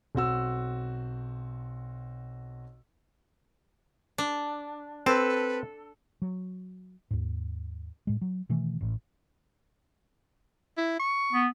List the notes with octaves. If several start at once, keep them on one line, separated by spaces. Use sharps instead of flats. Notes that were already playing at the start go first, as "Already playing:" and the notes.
B1 C4 F#4 E6
D4
C4 A4 B4
F#3
D#2 G#2
A2 G#3
F#3
B2 D#3 E3 A3
A1 A2
E4
C#6
B3